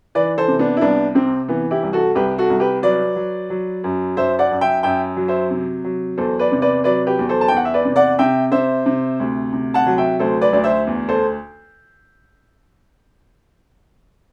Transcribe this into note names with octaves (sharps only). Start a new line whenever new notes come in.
E3 B4 D5
A4 C5
C3
B3 D4
E4
C2 B3 D4
C3 C4
E3 B3
E4 G4
C2
F#4 A4
C2 G4 B4
F#4 A4
C2
G4 B4
F#3 B4 D5
F#3
F#3
F#2
F#2 C5 E5
D5 F#5
F#2
E5 G5
F#2 E5 G5
F#3
C5 E5
C3
F#3
E2 A4 C5
B4 D5
C3
B4 D5
F#3 B4 D5
G4 B4
E2
A4 C5
A5
E2 G5
F#5
E5
B4 D5
C3
D5 F#5
C3 E5 G5
C3 C5 E5
C3
D2
C3
F#5 A5
F#3
E5 G5
D2 A4 C5
B4 D5
D2 D5
C5 E5
E2
A4 C5